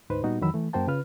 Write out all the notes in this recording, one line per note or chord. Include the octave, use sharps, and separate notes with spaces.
D2 G#2 D#4 B4 C5
A#2 G3 B3 D#4 F#4
F2 D#3 E3 F#3 B5 E6
E3 A3
F#2 A#3 F#4 C5 G5 A5
C#3 F4 B4 F6